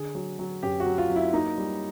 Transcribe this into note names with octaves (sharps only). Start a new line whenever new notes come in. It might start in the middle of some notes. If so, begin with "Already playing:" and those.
Already playing: D3 G#4
F#3
F#3
F#2 G4
F#4
F#3
F4
F#3
E4
A#3 D#4
G3